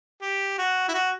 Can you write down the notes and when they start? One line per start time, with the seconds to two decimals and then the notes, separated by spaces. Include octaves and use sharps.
0.21 G4
0.58 F#4
0.89 E4
0.94 F#4